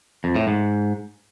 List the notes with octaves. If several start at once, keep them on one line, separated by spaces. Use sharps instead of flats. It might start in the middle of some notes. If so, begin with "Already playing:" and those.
F2
A2
G#2